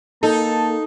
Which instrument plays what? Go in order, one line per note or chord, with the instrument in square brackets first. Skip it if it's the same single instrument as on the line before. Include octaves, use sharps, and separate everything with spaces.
[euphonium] A#3 [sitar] D#4 [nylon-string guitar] A4 [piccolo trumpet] A5